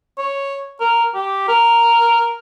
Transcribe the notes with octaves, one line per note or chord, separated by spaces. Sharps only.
C#5
A#4
G4
A#4